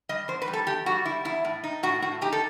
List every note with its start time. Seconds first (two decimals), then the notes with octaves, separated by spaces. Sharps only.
0.09 G3 D#5
0.28 E2 C5
0.42 B4
0.48 G3
0.53 A4
0.67 E2 G4
0.86 G3 F#4
1.05 G3 E4
1.25 E2 E4
1.45 A2
1.64 D#4
1.83 A2 F#4
2.02 A2 F#4
2.21 D#4 G4
2.32 A4